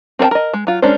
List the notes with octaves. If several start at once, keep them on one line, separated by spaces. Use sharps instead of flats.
C4 A#4 B4 G5 A5
A#4 D#5
G#3
F#3 F4
G#3 C#4 D4 A#4 C5